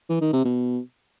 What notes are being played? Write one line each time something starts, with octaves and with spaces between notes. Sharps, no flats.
E3
D#3
C3
B2